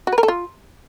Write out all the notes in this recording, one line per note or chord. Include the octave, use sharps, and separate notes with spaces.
F#4
B4
A#4
A4
F4